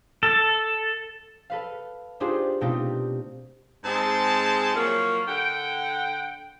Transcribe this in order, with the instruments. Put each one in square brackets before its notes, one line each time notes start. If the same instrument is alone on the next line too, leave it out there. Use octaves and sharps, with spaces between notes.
[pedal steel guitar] A4
[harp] A4 B4 F5
D4 D#4 F4 G4 G#4 C5
B2 A3 C4 D#4 F4 G4
[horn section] G#2 C4 G#4 D#5 A5
F3 F#3 A#3 C#5
D3 F#5 G5